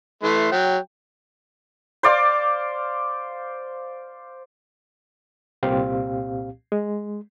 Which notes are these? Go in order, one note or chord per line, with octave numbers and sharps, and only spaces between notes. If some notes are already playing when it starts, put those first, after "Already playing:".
E3 A3 C6
F#3 G5
C5 D5 F5 D6
C2 A#2 C4 G4 F5
G#3